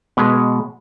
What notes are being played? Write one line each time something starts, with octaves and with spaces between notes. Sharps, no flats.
B2 G#3 B4